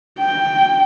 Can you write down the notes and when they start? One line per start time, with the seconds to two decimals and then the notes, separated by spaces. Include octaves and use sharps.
0.20 G5